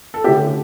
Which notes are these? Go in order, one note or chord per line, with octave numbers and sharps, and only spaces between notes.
A4
D3 A3 C#4 E4 G4